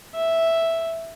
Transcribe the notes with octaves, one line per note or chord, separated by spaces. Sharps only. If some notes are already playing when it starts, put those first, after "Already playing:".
E5